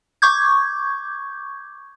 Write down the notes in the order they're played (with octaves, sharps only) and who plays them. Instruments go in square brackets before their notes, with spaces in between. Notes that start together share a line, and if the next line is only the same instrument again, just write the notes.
[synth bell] C#6 D6 G6 G#6